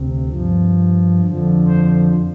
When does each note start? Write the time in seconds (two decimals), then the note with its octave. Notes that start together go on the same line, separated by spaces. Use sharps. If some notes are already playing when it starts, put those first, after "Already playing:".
Already playing: D2 C3
0.29 G2 F3
1.21 F2 D3 F3
1.67 C5